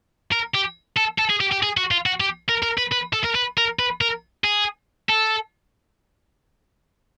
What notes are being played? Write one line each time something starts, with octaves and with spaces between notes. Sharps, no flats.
A#4
G4
A4
A4
G#4
G4
G4
G#4
F#4
F4
F#4
G4
A#4
A#4
B4
B4
A4
A#4
B4
A#4
B4
A#4
G#4
A4